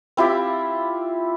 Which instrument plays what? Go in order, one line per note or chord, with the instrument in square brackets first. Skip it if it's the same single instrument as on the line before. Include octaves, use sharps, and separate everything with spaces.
[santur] C4 E4 F4 G4